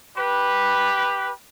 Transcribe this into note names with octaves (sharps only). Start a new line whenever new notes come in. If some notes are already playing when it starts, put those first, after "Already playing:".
G4 B4